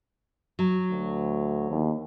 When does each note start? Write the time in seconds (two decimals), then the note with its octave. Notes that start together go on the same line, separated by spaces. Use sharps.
0.59 F#3
0.91 D2
1.70 D#2